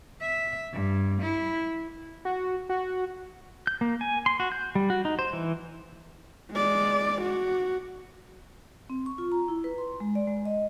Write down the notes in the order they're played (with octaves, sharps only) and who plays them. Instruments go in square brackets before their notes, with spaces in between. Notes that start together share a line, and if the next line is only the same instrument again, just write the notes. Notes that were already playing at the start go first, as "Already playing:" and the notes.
[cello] E5
G2
E4
[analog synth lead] F#4
F#4
[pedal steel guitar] G6
A#3
G#5
C6
F#4
G6
G3
F#4
D#4
C5
E3
[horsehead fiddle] G#3 D5
F#4
[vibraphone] C4
C#6
F4
A#5
E4
B4
C6
G#3
D5
G#3
D#5